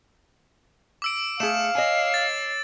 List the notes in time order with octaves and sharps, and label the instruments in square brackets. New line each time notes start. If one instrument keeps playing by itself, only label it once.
[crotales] D6 E6 D7
[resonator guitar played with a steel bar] A3 G#4 [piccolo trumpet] F5 [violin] C#7 [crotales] E7
[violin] C#5 C7 [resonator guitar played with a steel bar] D#5 G#5
[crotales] A6